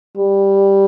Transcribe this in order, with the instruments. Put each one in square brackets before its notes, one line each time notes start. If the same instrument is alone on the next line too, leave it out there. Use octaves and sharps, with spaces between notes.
[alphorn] G3